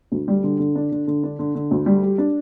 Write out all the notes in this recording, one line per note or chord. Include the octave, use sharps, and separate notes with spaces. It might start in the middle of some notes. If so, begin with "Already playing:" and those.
D2
G3
D3
D3
D4
D3
D3
D4
D3
D3
D2
G3
G4
D4